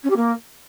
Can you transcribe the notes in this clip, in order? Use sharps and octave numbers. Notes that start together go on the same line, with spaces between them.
C#4
G4
A#3